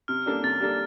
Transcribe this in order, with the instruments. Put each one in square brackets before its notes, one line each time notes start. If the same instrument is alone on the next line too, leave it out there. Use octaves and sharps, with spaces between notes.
[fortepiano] C3 [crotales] F6
[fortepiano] G3 A#3 D4 A4
[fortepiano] C3 [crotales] A6
[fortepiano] G3 A#3 D4 A4